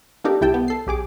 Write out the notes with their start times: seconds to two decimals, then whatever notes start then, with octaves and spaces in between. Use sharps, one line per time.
0.24 A#3 D4 D#4 G4 A4 A#4
0.41 C2 E4 G4 G5 A5
0.54 B3
0.68 A4 C7
0.87 B1 G4 G#4 D6